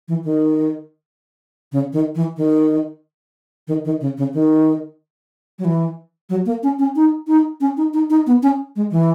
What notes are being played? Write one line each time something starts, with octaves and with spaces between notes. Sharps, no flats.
E3
D#3
C#3
D#3
E3
D#3
D#3
D#3
C#3
C#3
D#3
F#3
E3
F#3
A#3
C#4
C#4
D#4
D#4
C#4
D#4
D#4
D#4
B3
C#4
G#3
E3